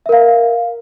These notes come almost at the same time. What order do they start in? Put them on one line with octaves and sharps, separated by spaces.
E5 A#4 F5